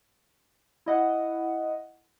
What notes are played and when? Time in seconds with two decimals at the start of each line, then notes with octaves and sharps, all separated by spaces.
0.86 E4 D#5 F#5